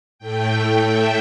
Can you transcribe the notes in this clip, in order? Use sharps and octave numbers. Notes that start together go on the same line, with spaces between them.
A2 A3 G5
E5